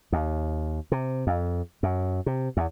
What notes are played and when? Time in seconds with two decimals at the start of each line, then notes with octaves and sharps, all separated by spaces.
0.12 D#2
0.92 C3
1.27 F2
1.83 F#2
2.26 C3
2.57 E2